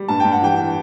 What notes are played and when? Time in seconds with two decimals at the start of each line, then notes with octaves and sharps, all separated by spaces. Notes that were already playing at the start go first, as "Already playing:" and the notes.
Already playing: G3
0.08 G2 A5
0.20 G2 G5
0.32 F#5
0.42 E3 G5